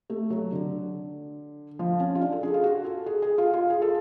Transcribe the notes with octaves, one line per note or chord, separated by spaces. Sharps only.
A3
F#3
D3
F3
C#4
F4
D4
A4
G#4
F4
F#4
A4
G#4
G#4
F4
F4
G#4
A4